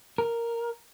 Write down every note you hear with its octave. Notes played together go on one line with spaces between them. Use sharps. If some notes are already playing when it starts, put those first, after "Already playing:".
A#4